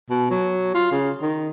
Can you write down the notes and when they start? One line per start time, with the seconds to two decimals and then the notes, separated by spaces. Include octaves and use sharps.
0.10 B2
0.31 F#3
0.75 F4
0.92 C#3
1.22 D#3